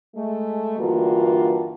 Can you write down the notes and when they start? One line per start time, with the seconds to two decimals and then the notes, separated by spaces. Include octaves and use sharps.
0.15 G#3 A3
0.79 G2 D3 E3 A#3 F4 F#4